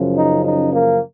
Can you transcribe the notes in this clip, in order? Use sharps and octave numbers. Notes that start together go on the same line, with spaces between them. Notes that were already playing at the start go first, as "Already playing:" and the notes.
Already playing: F#2 C#3 F3
D#4
D#4
A#3